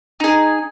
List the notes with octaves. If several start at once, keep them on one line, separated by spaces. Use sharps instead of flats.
D#4 G#4